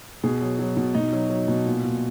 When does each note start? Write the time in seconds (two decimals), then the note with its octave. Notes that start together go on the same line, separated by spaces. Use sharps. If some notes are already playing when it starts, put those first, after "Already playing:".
0.23 B2 G#4
0.41 F#3
0.59 F#3
0.77 B2
0.95 B2 D#4
1.13 F#3
1.30 F#3
1.48 B2
1.66 A#2
1.84 A#2